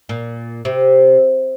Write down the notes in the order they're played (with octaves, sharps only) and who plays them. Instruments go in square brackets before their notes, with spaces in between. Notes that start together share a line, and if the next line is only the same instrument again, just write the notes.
[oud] A#2
C3